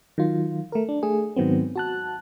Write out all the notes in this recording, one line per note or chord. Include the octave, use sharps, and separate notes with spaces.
D#3 F#3 F4
A3 A#4
D4
A3 G#4
G#2 D#3 F#3 B3 C4
F#4 A5 F#6